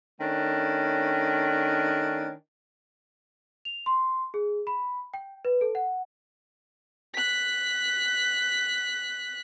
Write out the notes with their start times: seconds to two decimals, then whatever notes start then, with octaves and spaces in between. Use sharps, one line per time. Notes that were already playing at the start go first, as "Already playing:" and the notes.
0.21 D#3 A3 C#4 D4
3.65 F7
3.86 C6
4.34 G#4
4.67 B5
5.14 G5
5.45 B4
5.61 A4
5.75 F#5
7.14 F#6 B6